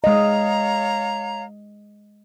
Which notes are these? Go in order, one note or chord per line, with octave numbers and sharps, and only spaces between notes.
G#3 C#5 D#5 F5 A#5